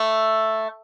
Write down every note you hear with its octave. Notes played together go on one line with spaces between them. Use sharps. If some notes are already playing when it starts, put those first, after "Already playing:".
Already playing: A3